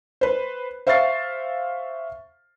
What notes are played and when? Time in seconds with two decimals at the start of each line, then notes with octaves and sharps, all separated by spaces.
0.21 B4 C5
0.87 C5 E5 F5 C#6 A6 C7